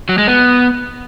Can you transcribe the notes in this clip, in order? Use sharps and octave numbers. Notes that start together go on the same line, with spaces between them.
F#3
G#3
B3